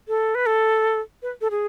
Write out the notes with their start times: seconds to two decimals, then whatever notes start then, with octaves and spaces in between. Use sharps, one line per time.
0.08 A4
0.35 B4
0.46 A4
1.22 B4
1.41 A4
1.51 G#4